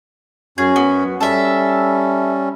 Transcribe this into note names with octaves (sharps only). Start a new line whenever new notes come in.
F#2 C#4 F#4 G#4
B3
G3 C#4 A4 E5